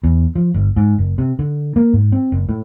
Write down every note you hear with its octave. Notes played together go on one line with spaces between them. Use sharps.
E2
F3
G1
G#2
F#1
C3
D3
A#3
G#2
C4
F#1
A2